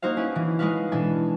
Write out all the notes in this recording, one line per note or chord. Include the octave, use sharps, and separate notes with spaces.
A#3 D#4 F#4 C5 F5
C#4 E4 G#4 B4
E3
G#3 D#4 F#4 B4 F5
B2 E3 D4 A4 G#5